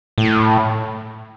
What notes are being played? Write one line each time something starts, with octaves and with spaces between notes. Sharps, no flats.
A2